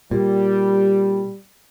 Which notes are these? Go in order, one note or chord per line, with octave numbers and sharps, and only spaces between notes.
A#2 G3